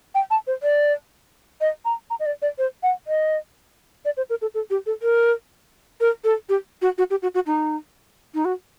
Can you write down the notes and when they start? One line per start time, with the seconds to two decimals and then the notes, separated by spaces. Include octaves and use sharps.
0.15 G5
0.31 A5
0.47 C5
0.63 D5
1.61 D#5
1.85 A#5
2.10 A#5
2.20 D#5
2.26 D5
2.42 D5
2.58 C5
2.83 F#5
3.07 D#5
4.05 D5
4.17 C5
4.30 A#4
4.42 A4
4.54 A4
4.70 G4
4.86 A4
5.02 A#4
6.01 A#4
6.24 A4
6.49 G4
6.82 F#4
6.98 F#4
7.10 G4
7.22 F#4
7.35 F#4
7.47 D#4
8.34 D#4
8.45 F#4